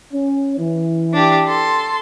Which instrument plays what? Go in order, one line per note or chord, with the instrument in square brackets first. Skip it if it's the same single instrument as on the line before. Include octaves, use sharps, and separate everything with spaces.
[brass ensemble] C#4
E3
[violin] D4 G4
A4 C6